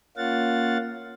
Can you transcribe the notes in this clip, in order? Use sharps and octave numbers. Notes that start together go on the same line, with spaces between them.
A#3 C#4 F4 F5 F#5 A6